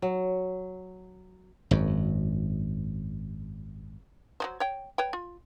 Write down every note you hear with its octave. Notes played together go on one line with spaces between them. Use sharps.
F#3
G#1 F#2
F#3 G3 C5
C#5 G5
B4 C#5 G5
F4